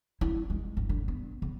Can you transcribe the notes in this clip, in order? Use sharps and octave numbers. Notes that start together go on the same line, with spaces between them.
E4
G#3
G1
D3
B3
C#3